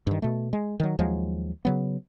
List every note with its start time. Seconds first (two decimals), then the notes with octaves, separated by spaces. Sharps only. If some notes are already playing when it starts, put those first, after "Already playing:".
0.07 G2 D#3
0.22 B2 A3
0.53 G#3
0.80 D#3 F#3
0.99 D#2 F3 F#3 G#3
1.65 C#3 F#3 B3